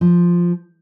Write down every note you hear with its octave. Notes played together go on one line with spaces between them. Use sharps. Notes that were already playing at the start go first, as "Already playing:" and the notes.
F3